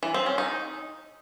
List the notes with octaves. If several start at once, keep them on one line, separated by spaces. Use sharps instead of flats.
E3
C4
C#4
D#4